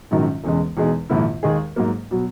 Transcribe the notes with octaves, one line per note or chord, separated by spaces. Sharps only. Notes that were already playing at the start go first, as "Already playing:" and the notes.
A#1 G#2 D#3 F#3 C#4
E1 E2 C#3 G#3
E2 B2 G#3 D#4 G#4
A#1 G#2 D#3 A#3 E4
D#2 D#3 G#3 D#4 G#4
G#2 F#3 A#3
B2 F#3